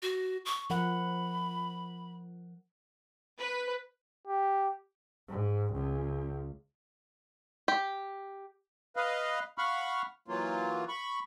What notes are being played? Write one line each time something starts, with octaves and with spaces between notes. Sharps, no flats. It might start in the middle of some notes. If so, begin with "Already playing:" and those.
F#4
C#6
F3 A#4 F#5 B5
B4
G4
G#2
C#2
G4
B4 D#5 F5
F5 F#5 B5 C#6 F6
E3 F#3 A#3 F4
B5 C#6